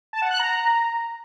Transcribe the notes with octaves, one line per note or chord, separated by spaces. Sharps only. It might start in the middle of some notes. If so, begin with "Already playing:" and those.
A5
F#5
F#6
A#5